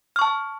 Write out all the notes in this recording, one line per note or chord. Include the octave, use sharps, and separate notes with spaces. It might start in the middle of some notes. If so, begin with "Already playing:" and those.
A5 C#6 F6